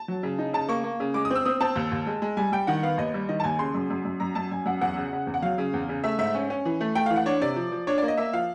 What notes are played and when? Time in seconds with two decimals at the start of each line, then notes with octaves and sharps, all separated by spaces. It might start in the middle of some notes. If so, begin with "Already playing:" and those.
Already playing: A5
0.08 F#3
0.23 C#3
0.39 D#4
0.53 C#3 A5
0.69 A#3 C#6
0.84 A#3
1.00 C#3
1.14 G#3 D6
1.25 D#6
1.31 C4 E6
1.45 C4 D#6
1.60 C4 A5
1.76 D#2
1.92 D#2
2.07 G#3
2.22 G#3
2.37 G3 G#5
2.52 G3 G5
2.67 D#3 F#5
2.83 B3 F5
2.98 D#2 D#5
3.14 G3
3.29 D#3 D#5
3.40 A5
3.44 D#2 G#5
3.59 C#3 C6
3.74 F#2
3.90 F#2
4.05 F#2
4.20 F#2 A#5
4.35 F#2 A5
4.51 F#2 G#5
4.66 F#2 F#5
4.81 E2 F#5
4.97 C#3
5.13 C#3
5.27 E2
5.34 F#5
5.42 F#3 F5
5.58 C#3
5.74 E2
5.89 C#3
6.04 A3 E5
6.19 G#2 E5
6.35 C#4
6.50 C#4
6.65 E3
6.81 A3
6.95 A3 G5
7.06 F5
7.10 E3
7.16 F#5
7.26 D4 C#5
7.41 C3 D5
7.56 F3
7.72 F3
7.87 D4 C#5
7.98 D5
8.03 A#3
8.08 D#5
8.18 A#3 E5
8.33 F3 F5